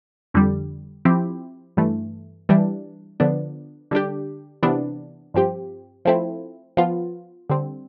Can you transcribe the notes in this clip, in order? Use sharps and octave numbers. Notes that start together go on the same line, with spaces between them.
F2 D3 G3
F3 C4 E4 G4
G2 E3 A3
E3 G3 D4
D3 F3 B3 D4
D3 G3 D4 G4
C3 E3 B3 D4
G2 F3 C4 G4
F3 A3 C4 E4
F3 B3 F4
D3 G3 C4